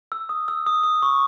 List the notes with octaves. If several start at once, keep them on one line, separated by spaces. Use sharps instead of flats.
E6
D#6
E6
D#6
D#6
C#6